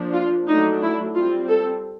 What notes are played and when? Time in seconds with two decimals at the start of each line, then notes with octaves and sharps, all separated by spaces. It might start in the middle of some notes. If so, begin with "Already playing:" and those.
Already playing: F3 A#3 D4
0.14 F4
0.48 F#3 A3 D4 D#4
0.82 E4
1.15 G3 C4 F4
1.49 A4